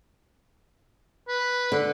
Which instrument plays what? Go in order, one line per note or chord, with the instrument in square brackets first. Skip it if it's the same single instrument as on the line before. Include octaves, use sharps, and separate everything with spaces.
[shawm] B4
[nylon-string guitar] D3